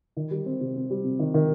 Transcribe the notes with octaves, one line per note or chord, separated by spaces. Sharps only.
D#3
G3
C4
C3
C4
G3
C3
D#3
D#3